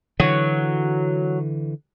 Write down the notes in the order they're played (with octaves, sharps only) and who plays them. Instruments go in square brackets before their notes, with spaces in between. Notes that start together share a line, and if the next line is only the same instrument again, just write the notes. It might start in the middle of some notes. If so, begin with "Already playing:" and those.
[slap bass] D3 E3 [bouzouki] F#3